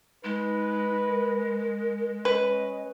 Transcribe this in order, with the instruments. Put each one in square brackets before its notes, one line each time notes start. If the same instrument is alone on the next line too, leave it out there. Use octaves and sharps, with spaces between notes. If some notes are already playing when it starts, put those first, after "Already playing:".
[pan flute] G#3 [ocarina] D#4 [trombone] B4
[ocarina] A#4
[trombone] C#4 [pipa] B4 [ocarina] D#5